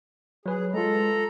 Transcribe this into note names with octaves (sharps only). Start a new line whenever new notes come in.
F#3 G#4 B4
G#3 F4 A4 A#5